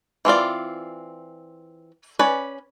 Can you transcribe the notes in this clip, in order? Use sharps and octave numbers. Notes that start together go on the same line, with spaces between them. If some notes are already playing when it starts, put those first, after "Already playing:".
E3 C4 F4 D5
C#4 B4 D5